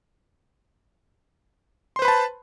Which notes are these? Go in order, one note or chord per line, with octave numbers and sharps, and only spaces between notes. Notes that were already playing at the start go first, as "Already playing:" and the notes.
B4 C5 A5 B5 C6